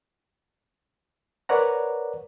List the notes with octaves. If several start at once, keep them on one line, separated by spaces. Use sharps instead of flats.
A#4 B4 C#5 D5 F#5 A#5